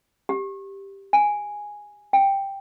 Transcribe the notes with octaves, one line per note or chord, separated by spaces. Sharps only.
G4
G#5
G5